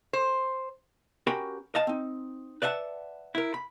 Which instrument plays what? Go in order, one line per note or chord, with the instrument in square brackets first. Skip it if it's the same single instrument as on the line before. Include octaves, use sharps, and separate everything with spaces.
[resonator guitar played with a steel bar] C5
[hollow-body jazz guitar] C#4 F#4 G4 A#4 G5 B5
D#5 F5 A5
C4 D#4
B4 D5 E5 F#5 A5
E4 A#4
B5